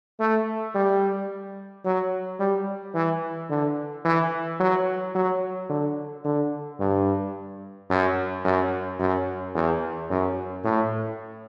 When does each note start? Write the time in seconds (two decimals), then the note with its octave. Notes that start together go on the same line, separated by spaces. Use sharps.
0.20 A3
0.75 G3
1.85 F#3
2.40 G3
2.95 E3
3.50 D3
4.05 E3
4.60 F#3
5.15 F#3
5.69 D3
6.24 D3
6.80 G2
7.90 F#2
8.45 F#2
8.99 F#2
9.54 E2
10.10 F#2
10.65 A2